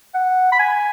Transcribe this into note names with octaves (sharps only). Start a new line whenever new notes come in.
F#5
B5
G#5